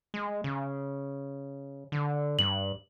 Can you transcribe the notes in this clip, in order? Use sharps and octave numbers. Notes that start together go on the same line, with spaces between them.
G#3
C#3
D3
G2 F#7